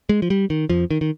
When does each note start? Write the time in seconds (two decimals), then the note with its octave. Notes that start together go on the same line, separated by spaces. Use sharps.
0.09 G#3
0.22 F3
0.30 G3
0.50 D#3
0.70 F2 F3
0.91 D#3
1.01 D#3